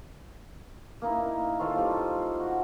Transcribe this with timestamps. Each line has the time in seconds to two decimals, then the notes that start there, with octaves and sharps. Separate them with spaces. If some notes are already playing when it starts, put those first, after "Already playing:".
1.02 A#3 D#4 E4
1.59 F4 A4 C5 C#5
1.78 G3 F4
2.40 F#4